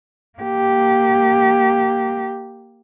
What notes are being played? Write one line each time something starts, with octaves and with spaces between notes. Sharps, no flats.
A#3 G4